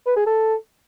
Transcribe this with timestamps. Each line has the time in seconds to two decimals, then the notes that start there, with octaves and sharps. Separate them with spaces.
0.06 B4
0.16 G#4
0.26 A4